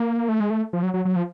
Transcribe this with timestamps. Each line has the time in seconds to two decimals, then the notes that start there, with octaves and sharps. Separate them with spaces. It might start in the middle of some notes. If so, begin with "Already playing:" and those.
Already playing: A#3
0.29 A3
0.40 G#3
0.50 A3
0.73 F3
0.83 F#3
0.94 F#3
1.05 F#3
1.16 F3